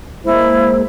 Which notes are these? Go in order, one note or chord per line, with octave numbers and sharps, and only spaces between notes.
G#3 A#3 E4 C5